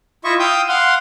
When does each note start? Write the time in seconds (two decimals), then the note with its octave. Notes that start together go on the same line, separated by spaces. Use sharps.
0.24 E4 F4 D#5 E5 C#6
0.40 F5 G5 D#6 E6 G6
0.68 F5 F#5 C6